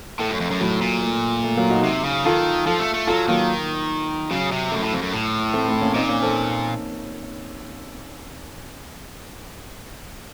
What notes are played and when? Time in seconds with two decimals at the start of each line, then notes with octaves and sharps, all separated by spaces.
0.20 A2 A3
0.30 F#2
0.41 F2
0.51 F#2
0.61 A2 F#3
0.81 A#2
1.02 A3
1.44 A3
1.57 F#3 A#3
1.70 D#4 F#4
1.84 C3
2.05 C#3
2.25 D#3 F4 A4
2.66 F3 F4 A4
2.80 A3
2.94 A3
3.07 F#3 F4 A4
3.28 D#3 F#3 A#3
4.31 C#3 F#3
4.52 C3
4.71 F#2 A3
4.82 A2
4.93 F2
5.02 F#2
5.13 A2
5.53 A3 C4
5.68 A3 C4
5.81 A#3 C#4
5.95 A#2 C4 D#4
6.09 A#3 C#4
6.22 A4 C5